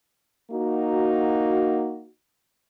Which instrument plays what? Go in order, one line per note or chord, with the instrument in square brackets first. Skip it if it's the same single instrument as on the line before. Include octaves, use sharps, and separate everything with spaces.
[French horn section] A#3 D#4 F#4